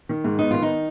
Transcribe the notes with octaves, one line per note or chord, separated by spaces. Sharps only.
D#3
G#2
B3 D#4
D#3 F4
D#4